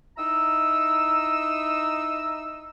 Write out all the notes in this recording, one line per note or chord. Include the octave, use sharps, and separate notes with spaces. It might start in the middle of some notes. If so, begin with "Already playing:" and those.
D#4 E4 A#5 E6